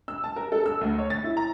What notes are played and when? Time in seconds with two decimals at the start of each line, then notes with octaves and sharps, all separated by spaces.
0.08 E6
0.24 A5
0.36 A#4
0.52 A4
0.66 E6
0.81 D2
0.98 C#5
1.10 A6
1.24 E4
1.37 A#5